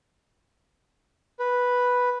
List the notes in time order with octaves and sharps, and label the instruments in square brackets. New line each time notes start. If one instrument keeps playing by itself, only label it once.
[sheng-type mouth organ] B4